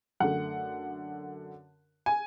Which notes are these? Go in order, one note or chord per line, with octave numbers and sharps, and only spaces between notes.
F#2 D3 A3 F#5
G#5